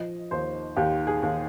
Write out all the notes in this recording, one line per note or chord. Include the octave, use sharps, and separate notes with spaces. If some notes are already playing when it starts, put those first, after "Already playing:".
Already playing: F3 D#5
D#2 C5
D#2 G4
G#4
D#2